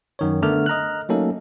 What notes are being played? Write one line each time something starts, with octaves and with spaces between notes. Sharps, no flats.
F#2 D#3 C#5
D3 A3 B3 A#4 F6
D#5 A#5 F6 F#6
F#3 A3 A#3 C#4 D#4 A4